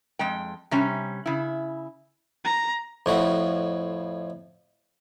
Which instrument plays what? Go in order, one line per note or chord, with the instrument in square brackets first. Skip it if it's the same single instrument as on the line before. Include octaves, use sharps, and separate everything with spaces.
[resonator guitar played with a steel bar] F2 G#3 G5
C3 G3 C#4
C#3 E4
[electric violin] A#5
[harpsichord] F2 A2 F#4